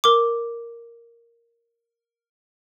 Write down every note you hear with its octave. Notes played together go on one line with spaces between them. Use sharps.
A#4 D6